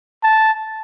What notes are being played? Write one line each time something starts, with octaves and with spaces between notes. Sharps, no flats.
A5